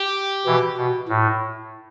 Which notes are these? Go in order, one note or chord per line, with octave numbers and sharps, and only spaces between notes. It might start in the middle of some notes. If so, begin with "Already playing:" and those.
Already playing: G4
B2 E3
B2
A2